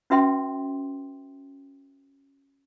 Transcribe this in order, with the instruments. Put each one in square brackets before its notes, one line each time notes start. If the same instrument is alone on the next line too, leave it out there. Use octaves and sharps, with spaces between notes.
[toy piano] C#4 F#4 B4 E5 G5 C6